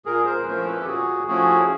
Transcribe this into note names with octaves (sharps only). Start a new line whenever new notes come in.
A#2 G#4 A#4
A#4 C5
B4
F3 A3 C#4 E4 A#4 C5
A4 B4
G4
A#2 F#4 G#4
F3 A3 C#4 E4 F#4 G#4